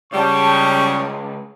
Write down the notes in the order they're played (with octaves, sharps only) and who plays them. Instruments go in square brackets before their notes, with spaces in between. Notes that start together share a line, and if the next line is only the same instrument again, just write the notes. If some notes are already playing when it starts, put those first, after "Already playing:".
[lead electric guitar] C#2 A5 [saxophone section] C#3 G3 [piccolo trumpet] C#6